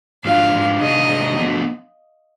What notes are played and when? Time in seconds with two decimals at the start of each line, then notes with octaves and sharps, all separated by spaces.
0.25 G#2 F3 G#3 D4 F5
0.53 G#2 F3 G#3 D4
0.80 C3 D#3 G#3 D4 G#4 D#5
1.08 C3 D#3 G#3 D4 G#4
1.37 D3 F3 B3